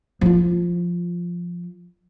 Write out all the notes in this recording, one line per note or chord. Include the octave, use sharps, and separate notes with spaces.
F3 F4